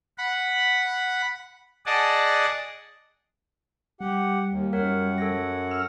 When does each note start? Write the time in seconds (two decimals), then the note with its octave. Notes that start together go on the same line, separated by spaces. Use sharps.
0.18 F#5 B5
1.86 G#4 D5 D#5 F#5 A5
4.00 G3 G4 F#5
4.50 D#2
4.73 F#2 A#4 C#5 F#5
5.18 A4 C#5 A#6
5.71 E6 F6